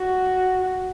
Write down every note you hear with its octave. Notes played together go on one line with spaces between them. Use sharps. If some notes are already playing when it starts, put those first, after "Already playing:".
Already playing: F#4